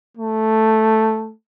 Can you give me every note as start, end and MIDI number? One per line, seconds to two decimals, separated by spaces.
0.17 1.33 57